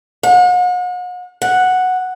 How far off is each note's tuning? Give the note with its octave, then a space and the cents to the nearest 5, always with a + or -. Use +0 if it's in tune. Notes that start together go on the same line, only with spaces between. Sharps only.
F#5 -40
F#5 -5